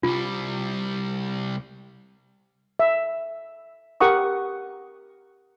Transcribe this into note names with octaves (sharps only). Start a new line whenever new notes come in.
C2 G3 F4
E5
G4 A#4 F#5 C#6 D#6